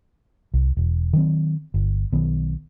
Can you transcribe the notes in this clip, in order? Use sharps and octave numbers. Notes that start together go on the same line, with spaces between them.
C2
E1
D#3 F#3 C4
G1
B1 D#3 B3